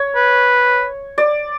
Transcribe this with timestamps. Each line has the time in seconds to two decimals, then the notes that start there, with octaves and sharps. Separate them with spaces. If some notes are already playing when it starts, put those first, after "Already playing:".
Already playing: C#5
0.16 B4
1.18 D5